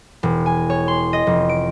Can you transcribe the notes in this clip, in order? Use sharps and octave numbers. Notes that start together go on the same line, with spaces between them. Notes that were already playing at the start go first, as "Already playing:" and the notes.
E1
G#5
C#5
C6
D#5
F1
D7